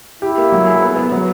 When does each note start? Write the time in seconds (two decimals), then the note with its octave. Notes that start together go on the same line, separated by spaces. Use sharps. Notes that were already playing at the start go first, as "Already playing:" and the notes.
0.22 E4 G4
0.38 A#3
0.52 F#3
0.67 G#4
0.82 B3
0.96 B3
1.12 F#3